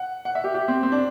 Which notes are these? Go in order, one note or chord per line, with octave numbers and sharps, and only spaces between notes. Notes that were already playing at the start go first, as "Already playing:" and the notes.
Already playing: F#5
F#5
E5
G4
G4
C4
C4
D4